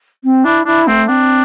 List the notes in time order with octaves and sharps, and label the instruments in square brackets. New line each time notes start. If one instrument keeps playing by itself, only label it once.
[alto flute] C4
[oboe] D4 [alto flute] E4
[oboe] D4 [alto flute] E4
[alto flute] A3 [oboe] C4
[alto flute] C4 [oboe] D4